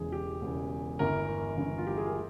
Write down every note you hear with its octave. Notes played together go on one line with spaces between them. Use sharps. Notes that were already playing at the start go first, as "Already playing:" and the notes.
Already playing: E1 E2 C#3 E3 G#4
G4
E1 E2 C#3 E3
G1 G2 E3 A#4
G1 G2 E3
F4
G4
G#4
A#4